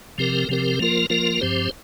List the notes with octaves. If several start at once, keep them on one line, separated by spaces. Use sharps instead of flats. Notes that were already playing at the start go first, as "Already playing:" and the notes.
C3 F3 C4 G4 A#4
C3 F3 C4 G4 A#4
F3 A#3 F4 A#4
F3 A#3 F4 A#4
G2 F3 C4 G4 C5